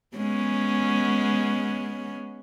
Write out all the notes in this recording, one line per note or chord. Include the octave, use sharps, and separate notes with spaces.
G#3 B3 C#4